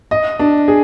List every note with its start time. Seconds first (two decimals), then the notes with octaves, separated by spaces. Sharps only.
0.11 D#5
0.39 D4
0.68 G#4